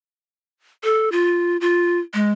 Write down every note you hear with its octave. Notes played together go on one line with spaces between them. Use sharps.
A4
F4
F4
G#3